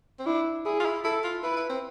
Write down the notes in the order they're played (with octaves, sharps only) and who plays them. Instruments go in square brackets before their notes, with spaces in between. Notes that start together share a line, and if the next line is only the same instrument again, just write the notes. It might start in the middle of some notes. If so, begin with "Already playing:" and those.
[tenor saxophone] C4
[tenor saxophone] D4 [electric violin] E4
[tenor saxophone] E4 [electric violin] G#4
[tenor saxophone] F4
E4
[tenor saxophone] E4 [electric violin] A4
[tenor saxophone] F4
[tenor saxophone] E4 [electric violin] B4
[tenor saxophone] E4
C4